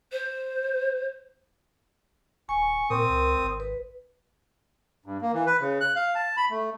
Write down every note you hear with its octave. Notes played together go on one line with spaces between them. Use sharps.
C5
D#1 G#5 C#6
A#2 C4 A#4 D#6
C#2
G#1
B4
G2
A#3
E3
B4
C#3
F#6
F5
A5
B5
A3